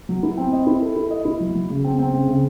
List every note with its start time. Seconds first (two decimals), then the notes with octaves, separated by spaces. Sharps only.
0.09 F#3
0.23 E4
0.38 C4
0.52 D#5
0.67 E4
0.82 A4
0.96 E4
1.11 D#5
1.25 E4
1.40 F#3
1.55 F#3
1.70 C#3
1.84 C4
1.99 C4
2.13 C#3
2.28 C#3